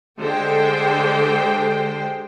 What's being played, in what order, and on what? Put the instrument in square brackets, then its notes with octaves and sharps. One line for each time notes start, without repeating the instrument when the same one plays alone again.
[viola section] D3 G#3 G4 A4 C5 G5